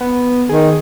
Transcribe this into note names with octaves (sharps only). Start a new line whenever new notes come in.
B3
D#3 G#4